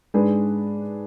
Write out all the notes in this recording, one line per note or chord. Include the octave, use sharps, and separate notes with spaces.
G#2 G#3 D4 G#4 B4